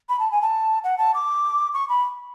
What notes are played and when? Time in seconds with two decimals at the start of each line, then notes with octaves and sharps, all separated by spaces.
0.09 B5
0.19 A5
0.31 G#5
0.41 A5
0.84 F#5
0.98 A5
1.14 D6
1.74 C#6
1.89 B5